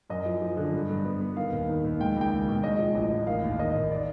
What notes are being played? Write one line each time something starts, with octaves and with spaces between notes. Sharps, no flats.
F#2 D#5
F3
F3
D3
G2
G2
B3
B3
D#3 F5
D#2
D#3
D#2
G#3 G5
C#2 G5
C#2
B2
G#3 D#5
F3
A1 D#5
A1
D#3 F5
D#2
D#3 D#5
D#2
D5